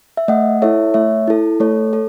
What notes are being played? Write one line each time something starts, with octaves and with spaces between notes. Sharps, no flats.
E5
A3 D#5 F#5
E4 A4 C#5 E5
A3 C#5 E5
E4 A4
A3 A4 C#5
A4